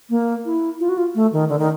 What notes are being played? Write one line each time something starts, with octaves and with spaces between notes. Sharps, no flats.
A#3
E4
F4
F#4
F4
A3
D#3
D3
D#3